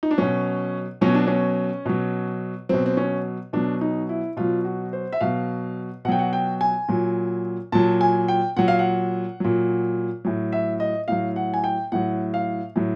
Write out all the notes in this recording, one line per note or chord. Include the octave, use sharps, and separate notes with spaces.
D#4
D4
B2 F#3 C#4
B2 F#3 C#4
D4
C#4
B2 F#3
B2 F#3 C4
C4
C#4
B2 F#3 D4
D#4
E4
B2 F#3 F4
F#4
C5
E5
B2 F#3 F5
B2 F#3 F#5 G5
F#5
G5
G#5
A#2 F#3
A#2 F#3 A5
G#5
G5
A#2 F#3 F#5
F5
F#5
A#2 F#3
A2 F#3
E5
D#5
A2 F#3 F5
F#5
G#5
G5
A2 F#3 F#5
F5
A2 F#3